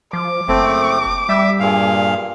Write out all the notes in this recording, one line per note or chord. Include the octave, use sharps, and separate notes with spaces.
F3 D6
F#1 A3 C4
G3 E5
G2 A#2 G#4 F5